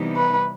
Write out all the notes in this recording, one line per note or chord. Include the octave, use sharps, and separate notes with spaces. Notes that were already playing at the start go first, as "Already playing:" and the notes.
Already playing: C3 E3 G3 B3 D#4
B4